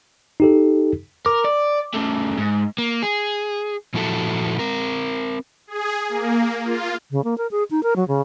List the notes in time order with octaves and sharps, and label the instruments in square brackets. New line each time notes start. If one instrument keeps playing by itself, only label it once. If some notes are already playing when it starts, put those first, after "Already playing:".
[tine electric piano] D#4 G4 A4
[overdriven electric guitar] A#4 [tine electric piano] D6
[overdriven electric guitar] D5
C#3 A3
G#2
[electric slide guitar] A#3
G#4
A#2 F3 E4 F#4 A4
C4 A#4
[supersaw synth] G#4
A#3
F4
[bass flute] C#3
A#3
A#4
G#4
D#4
A#4
F#3
C#3